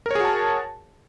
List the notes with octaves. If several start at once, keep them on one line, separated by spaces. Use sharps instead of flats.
F#4 G#4 A#4 C#5 A5